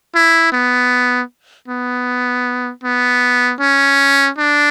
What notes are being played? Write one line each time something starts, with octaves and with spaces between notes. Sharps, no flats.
E4
B3
B3
B3
C#4
D4